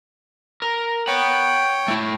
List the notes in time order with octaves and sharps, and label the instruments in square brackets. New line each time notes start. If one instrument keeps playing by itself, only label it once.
[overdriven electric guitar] A#4
[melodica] C#5 G5 [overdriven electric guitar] F#5 B5
[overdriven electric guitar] A3 E4